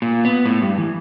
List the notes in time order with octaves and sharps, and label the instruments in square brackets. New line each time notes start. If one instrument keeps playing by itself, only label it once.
[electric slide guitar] A#2
B3
A2
G2
E3